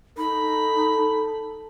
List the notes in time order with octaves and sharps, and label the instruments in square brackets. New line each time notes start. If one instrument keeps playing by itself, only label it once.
[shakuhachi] D#4 [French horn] A4 [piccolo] B5